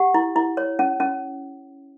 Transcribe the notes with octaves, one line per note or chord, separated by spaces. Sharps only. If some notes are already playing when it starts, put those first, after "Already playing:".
Already playing: G4 F#5
E4
E4
C#5
C#4
C#4